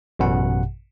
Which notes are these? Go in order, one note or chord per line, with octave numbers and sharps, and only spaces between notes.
A1 F#2 B2 F#5